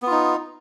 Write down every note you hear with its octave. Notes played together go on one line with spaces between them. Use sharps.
B3 D#4 F4